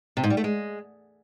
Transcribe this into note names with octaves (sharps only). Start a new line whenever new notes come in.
C3
G#2
G3
A3
G#3